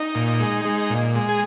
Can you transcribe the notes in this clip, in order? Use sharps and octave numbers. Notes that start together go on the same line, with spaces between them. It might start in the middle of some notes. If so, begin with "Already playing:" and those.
Already playing: D#4
A#2
G#3
G#3
A#2
G#3
G#4